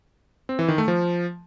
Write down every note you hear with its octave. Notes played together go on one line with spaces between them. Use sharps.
C4
E3
D#3
A3
F3